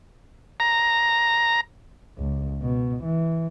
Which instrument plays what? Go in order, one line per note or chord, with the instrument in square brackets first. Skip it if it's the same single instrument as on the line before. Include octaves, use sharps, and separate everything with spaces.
[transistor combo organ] A#5
[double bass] C#2
B2
E3